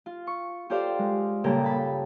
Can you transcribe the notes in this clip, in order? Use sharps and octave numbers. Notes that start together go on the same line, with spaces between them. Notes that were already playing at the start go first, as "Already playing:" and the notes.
F4
C#6
F4 G4 A4 C5 D5 F5
G#3
G2 A#2 C#3 A4 G5 A#5
A5 B5